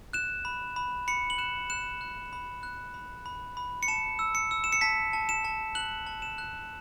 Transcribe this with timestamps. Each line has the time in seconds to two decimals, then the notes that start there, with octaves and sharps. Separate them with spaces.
0.13 F#6 E7
0.45 B5
0.76 B5
1.08 B5 C#7
1.30 F#7
1.38 F#6 E7
1.70 F#6 E7
2.01 F#6
2.33 B5
2.63 F#6
2.94 B5
3.26 B5
3.57 B5
3.83 C#7
3.88 A5 E7
4.19 E6
4.35 C#7
4.51 E6
4.64 E7
4.72 C#7
4.81 A5 B6
5.13 A5
5.29 E7
5.45 A5
5.75 F#6 F#7
6.07 A5
6.22 E7
6.38 F#6